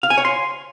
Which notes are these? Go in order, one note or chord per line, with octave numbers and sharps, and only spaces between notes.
F5
G#5
C#5
C6